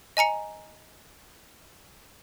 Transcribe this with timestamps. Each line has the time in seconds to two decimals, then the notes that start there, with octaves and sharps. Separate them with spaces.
0.17 D#5 G#5 A#5 C#7